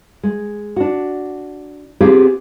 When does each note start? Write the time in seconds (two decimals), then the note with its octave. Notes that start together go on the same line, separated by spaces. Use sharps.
0.23 G#3
0.76 D4 F#4
2.00 B3 C4 F4 G4 G#4